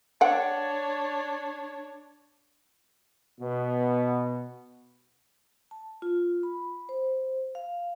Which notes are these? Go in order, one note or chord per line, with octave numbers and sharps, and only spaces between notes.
D4 C#5 F#5 G5
B2 B3
A5
F4
B5
C5
F5